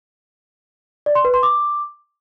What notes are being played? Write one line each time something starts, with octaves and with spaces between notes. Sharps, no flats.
D5
C6
B4
C6
D6